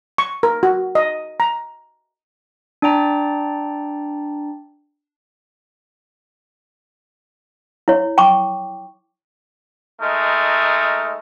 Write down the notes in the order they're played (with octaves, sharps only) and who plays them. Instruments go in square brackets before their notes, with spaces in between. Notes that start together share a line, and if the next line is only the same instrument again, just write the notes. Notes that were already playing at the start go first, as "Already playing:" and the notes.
[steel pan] C#6
A#4
F#4
D#5
A#5
[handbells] D4 D5 G5 A#5
[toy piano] E4 C#5
G5 A5 C#6 D6
[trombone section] G#3 A3 D#4 A#4